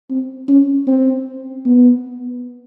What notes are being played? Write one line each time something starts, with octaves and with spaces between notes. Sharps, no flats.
C4
C#4
C4
B3